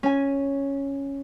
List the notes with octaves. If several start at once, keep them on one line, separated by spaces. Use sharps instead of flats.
C#4 G#5